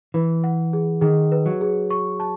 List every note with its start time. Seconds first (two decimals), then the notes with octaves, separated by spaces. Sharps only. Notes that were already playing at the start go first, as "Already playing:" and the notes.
0.14 E3 B4
0.44 F#5
0.73 G#4
1.01 D#3 G#4
1.32 B4
1.46 F#3
1.61 G#4
1.90 C#6
2.20 A5